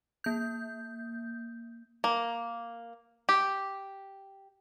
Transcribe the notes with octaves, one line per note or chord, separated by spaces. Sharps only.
A#3 G6
A#3
G4